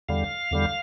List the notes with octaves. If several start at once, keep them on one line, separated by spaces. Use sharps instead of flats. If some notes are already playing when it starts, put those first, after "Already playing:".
E2 D3 G3 F5
E2 D3 G3